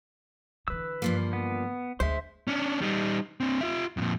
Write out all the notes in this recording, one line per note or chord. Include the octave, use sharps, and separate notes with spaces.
D3 E3 B4 E6
G2 F3 A#3
B3
D2 G#3 C5 E5
C#4 D4
G3 D#4
C4 D4
F4 E5
F2 A#2